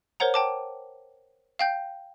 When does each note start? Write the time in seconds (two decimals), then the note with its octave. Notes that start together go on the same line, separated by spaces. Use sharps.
0.20 A#4 C5 C#5 F#5 A#5
0.34 G5 A5 D6
1.59 F5 G5 G6